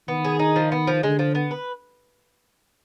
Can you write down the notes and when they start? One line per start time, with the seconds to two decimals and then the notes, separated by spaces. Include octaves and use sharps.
0.08 D#3 B3
0.25 G#4
0.39 D#4
0.56 F3
0.72 B3
0.87 F3
1.03 D3 G#3
1.19 F3
1.35 B3
1.51 B4